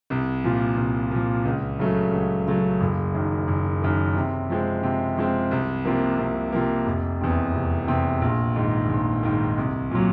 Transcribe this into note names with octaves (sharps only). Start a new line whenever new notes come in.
C2
A#2 F3
C2
A#2 F3
C#2
C#3 F#3 A3
C#2
C#3 F#3 A3
F#1
F#2 D#3
F#1
F#2 D#3
C3
F3 G#3 C4
C3
F3 G#3 C4
C2
C3 F3 A#3
C2
C3 F3 A#3
F1
E2 C3
F1
E2 C3
A#1
G#2 D#3
A#1
G#2 D#3
C2
A#2 F#3